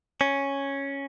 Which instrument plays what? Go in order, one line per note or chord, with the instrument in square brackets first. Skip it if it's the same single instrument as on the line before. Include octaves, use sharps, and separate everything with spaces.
[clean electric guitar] C#4